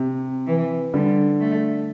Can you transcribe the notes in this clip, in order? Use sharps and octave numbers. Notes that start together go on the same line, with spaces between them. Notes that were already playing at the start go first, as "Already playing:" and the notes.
Already playing: C3
E3
D3 G3
A3